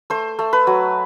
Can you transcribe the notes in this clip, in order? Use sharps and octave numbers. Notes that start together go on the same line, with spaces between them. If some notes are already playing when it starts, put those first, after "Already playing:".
A3 C5
A3
B4
F#3